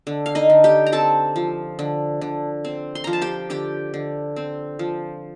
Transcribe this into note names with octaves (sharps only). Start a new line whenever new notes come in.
D3
F5
D#4 D#5
D3
G4 G5
A#5
C4 A4 A5
F3
D3
D3
C4
C6
F3 A#5
A5
G4 G5
D3 G4 G5
D3
C4
F3